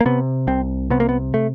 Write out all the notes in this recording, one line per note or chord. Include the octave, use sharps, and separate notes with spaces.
A#3
C3 B3
C2 C4
C3 B3
A#3
B3
A3